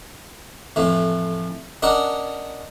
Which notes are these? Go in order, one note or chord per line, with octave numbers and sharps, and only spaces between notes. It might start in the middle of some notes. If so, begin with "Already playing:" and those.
F2 A2 E3
C#4 D4 A#4 D#5 F#5